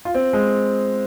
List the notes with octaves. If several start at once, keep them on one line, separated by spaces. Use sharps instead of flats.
F4
C4
G#3